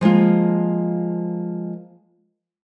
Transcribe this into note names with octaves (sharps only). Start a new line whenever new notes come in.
F3 G#3 A#3 F4